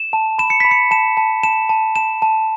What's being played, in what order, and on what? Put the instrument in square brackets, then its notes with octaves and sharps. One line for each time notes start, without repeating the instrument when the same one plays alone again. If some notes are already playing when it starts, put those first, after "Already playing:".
Already playing: [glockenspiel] E7
A5
B5 E7
C#7
B5 B6
C#7
A5 E7
A5
A5 E7
A5
A5 E7
A5